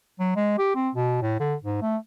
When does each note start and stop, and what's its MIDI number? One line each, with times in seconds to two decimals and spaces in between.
0.20 0.35 54
0.36 0.55 56
0.58 0.74 67
0.75 0.89 60
0.95 1.18 47
1.22 1.37 45
1.40 1.55 50
1.63 1.81 44
1.82 1.97 57